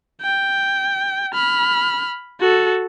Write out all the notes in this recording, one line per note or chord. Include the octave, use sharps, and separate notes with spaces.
G5
B5 F6
F#4 A4